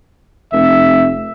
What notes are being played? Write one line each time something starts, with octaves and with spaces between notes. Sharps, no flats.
F1 E5